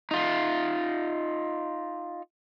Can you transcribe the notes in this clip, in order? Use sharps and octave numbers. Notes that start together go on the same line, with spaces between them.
D#4 F4